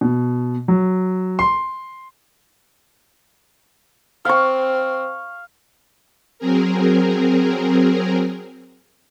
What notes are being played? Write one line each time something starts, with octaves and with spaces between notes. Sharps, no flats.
B2
F#3
C6
C4 F5 C#6
F#3 C4 G#4 A#4